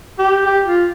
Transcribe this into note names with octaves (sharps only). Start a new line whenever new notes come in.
G4
G4
F4